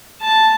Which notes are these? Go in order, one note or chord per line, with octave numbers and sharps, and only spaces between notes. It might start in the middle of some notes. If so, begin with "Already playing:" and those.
A5